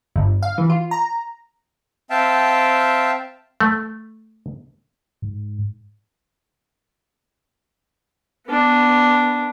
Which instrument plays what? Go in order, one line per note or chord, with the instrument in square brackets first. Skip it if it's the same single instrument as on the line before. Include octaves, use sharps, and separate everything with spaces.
[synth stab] G1
F5
E3
F4
A#5
[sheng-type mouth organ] C4 E5 F5 G5 A5
[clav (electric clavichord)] A3
[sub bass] G#2
[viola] B3 D4